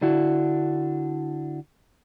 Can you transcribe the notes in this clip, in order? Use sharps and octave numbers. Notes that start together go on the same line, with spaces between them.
D3 D4 E4 F#4